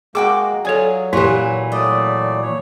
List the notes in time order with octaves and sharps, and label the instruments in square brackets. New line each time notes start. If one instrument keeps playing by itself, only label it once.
[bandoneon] G#3 A#3 [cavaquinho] F#4 G5 D6 [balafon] G#4
[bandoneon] F#3 [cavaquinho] F4 G#4 [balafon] A4 C#5 D5
[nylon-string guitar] A#2 E3 [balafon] E4 G4 [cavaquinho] C#5 F#5 G#5
[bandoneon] F#3 A3 D5 [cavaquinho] D#5
[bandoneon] C#5